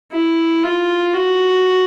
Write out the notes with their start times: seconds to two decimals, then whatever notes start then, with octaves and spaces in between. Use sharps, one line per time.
0.12 E4
0.63 F4
1.14 F#4